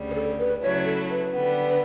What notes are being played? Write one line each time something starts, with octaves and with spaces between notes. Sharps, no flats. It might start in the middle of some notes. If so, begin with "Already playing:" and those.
Already playing: D2 C#3 G3
B4
A4
B4
C#3 F#3 A3 E4 C#5
A4
B4
D3 G3 B3